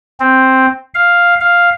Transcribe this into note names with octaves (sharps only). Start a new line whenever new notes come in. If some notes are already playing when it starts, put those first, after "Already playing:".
C4
F5
F5